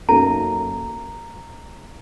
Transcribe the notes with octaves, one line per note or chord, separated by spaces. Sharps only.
F#2 F#3 A#3 D#4 A4 A#5